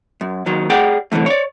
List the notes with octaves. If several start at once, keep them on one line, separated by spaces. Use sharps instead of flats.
F#2
D#2 D#3 F#3
G4 G#4 D5 F#5 G5
C2 A2 D3 E3 A3
C#5 D5